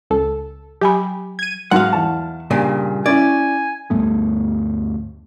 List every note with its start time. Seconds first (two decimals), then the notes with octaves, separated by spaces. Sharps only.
0.10 C#2 A4
0.81 F#3 G4 G#5 B5
1.39 G#6 D#7
1.71 G#2 F#3 F5 F#5 C6
1.92 E2 A5
2.51 G2 A#2 C#3
3.06 C#4 E4 D5 G#5
3.90 D2 G2 A3 B3